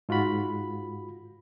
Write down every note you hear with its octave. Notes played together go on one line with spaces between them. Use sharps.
G#2 F4 F#4 B5